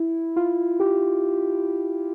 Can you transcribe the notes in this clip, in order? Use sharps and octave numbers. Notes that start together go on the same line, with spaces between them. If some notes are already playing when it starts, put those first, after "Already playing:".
Already playing: E4
F4
G4